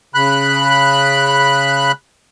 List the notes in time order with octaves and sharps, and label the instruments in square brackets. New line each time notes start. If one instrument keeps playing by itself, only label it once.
[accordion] C#3 B5 F#6